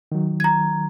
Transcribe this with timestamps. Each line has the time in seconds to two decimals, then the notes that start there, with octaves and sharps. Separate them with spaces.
0.12 D#3 F#3
0.40 A#5 G#6